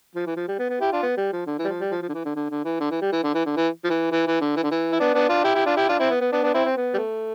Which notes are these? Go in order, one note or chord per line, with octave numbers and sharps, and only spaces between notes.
F3
E3
F3
G3
B3
B3
E4 G4
D4 F4
B3
G3
F3
D3
E3
G3
F3
G3
F3
F3
D3
E3
D3
D3
D3
E3
D3
E3
G3
E3
D3
E3
D3
E3
F3
E3
E3
E3
D3
E3
D3
E3
E4
B3 D4
B3 D4
D4 F4
E4 G4
E4 G4
D4 F4
E4 G4
D4 F4
C4 E4
B3
B3
B3 D4
B3 D4
C4 E4
C4
B3
G3
A3